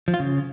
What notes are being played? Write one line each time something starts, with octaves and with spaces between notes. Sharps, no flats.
F3
F4
C#3